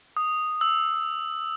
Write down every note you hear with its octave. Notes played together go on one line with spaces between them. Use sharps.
D#6
E6